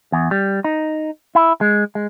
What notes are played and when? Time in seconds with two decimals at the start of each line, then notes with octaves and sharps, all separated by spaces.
0.12 E2
0.31 G3
0.64 D#4
1.35 E4
1.61 G#3
1.95 G#3